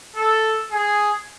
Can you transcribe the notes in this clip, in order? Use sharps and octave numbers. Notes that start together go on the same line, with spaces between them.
A4
G#4